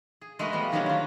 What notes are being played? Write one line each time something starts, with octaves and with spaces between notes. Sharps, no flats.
G#4
G#3 A3 F#4 A#4 B4
F3 G3 B3
D#3 F3 F#3 A#3 C#4 D4
D4 F4